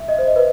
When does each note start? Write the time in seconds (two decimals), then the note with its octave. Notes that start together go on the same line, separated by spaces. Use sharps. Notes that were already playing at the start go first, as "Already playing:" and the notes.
Already playing: E5
0.08 D#5
0.18 C5
0.27 D#5
0.36 B4